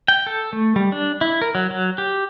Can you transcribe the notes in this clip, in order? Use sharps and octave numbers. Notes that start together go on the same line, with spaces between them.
G5
A4
A3
G3
D4
E4
A#4
F#3
F#3
G4